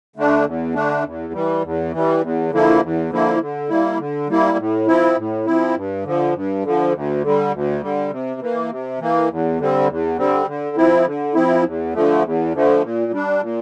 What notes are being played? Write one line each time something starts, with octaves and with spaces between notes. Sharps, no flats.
D3 A3 D4
E2
D3 A3 D4
E2
E3 G3
E2
E3 G3
E2
D3 F3 A#3 E4
E2
D3 F3 A#3 E4
D3
G3 A#3 E4
D3
G3 A#3 E4
A2
F3 C4 E4
A2
F3 C4 E4
G2
D3 F3
G2
D3 F3
D2
D3 G3
D2
D3 G3
C3
E3 A#3
C3
E3 A#3
E2
D3 G3 C4
E2
D3 G3 C4
D3
F3 C4 E4
D3
F3 C4 E4
E2
D3 F3 A3
E2
D3 F3 A3
A#2
G3 D4
A#2